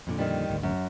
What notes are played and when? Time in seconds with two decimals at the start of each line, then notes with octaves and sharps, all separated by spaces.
0.07 F2 A#2 D3
0.18 D#3 G3
0.49 G#1 D2
0.63 F#2